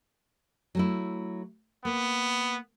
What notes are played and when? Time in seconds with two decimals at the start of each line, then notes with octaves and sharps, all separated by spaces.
0.75 F#3 A3 E4
1.85 A#3 B3